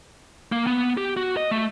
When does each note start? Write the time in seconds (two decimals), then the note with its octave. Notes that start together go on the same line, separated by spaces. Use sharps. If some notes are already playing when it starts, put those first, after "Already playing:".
0.52 A#3
0.67 B3
0.97 G4
1.17 F#4
1.37 D#5
1.51 A3